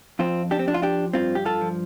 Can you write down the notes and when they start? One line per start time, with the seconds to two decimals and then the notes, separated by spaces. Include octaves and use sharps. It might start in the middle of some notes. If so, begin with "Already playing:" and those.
0.19 F2 C4 F4
0.51 D4 G4
0.59 C4
0.67 F3 D4
0.74 F4
0.82 D4 G4
1.13 G2 C4 F4
1.35 G4
1.45 F4 A4
1.61 F3